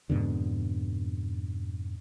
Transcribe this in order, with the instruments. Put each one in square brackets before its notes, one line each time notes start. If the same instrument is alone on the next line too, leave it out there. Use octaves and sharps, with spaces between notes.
[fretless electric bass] F2 G#2 B2 D3